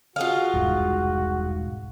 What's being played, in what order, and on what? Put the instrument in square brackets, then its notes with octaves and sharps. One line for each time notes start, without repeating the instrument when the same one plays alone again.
[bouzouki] F4 G#4 F5 [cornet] F#4
[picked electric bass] E1 C2 G#2